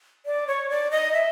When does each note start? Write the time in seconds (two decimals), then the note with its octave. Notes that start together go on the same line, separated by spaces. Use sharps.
0.26 D5
0.47 C#5
0.70 D5
0.91 D#5
1.13 E5